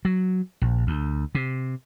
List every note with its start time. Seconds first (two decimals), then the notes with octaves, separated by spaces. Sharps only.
0.05 F#3
0.62 A#1
0.87 D2
1.35 C3